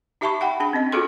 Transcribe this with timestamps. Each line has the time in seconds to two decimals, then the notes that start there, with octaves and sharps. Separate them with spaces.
0.21 D#4 G4 E5 A5 B5 C#6
0.41 F#5 G5 B5
0.60 D4 G#4 B5
0.73 C4 C#4 D#5
0.92 F4 F#4 G#4 A4 C6